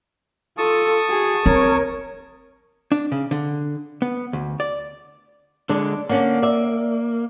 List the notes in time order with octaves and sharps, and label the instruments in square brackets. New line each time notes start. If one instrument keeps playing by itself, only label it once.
[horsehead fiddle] F4 A4 [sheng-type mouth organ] A5 C#6 D#6
[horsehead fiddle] F#4 G#4
[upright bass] C4 [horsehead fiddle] A#4 C#5
[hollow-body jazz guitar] D4
C#3
D3
B3
D2
D5
[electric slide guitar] D3 G#3 [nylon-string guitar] D4
[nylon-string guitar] D3 C#4 D4 [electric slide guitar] A#3
[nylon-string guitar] D5 E5